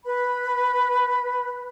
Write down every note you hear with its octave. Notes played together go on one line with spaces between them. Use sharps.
B4 B5